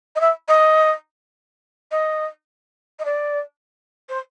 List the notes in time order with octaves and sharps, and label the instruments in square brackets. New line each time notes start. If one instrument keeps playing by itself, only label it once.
[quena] D#5
E5
D#5
D#5
D#5
D5
C5